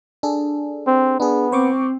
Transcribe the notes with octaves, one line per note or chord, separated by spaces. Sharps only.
D4 G#4 A4
C4
B3 D4 G#4
C4 C5 C#6 D6